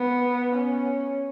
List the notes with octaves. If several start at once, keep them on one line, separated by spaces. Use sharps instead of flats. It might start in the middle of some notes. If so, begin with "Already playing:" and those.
Already playing: B3
C#4